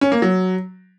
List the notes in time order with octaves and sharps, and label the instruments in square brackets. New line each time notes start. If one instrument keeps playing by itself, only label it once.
[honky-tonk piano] C#4
A#3
F#3